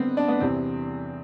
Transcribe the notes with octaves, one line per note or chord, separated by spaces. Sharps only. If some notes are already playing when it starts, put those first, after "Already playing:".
Already playing: G2 D3 B3 C4
D4
B3
E2 C3 E3 C4